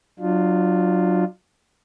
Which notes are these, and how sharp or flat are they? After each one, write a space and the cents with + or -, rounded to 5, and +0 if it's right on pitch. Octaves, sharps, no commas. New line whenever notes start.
F#3 +0 D4 +35 F4 +0